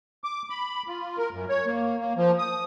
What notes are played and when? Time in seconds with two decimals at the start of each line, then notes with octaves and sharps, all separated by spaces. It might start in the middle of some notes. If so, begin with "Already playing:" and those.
0.24 D6
0.50 B5
0.88 F4
1.18 A#4
1.32 F#2
1.49 C#5
1.66 A#3
1.99 A#3
2.17 F3
2.39 D#6